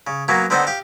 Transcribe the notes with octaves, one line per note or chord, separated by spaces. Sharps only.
C#3
F#3 A#3 B3 C#4
D3 B3 C4 D#4 C5
G4 F5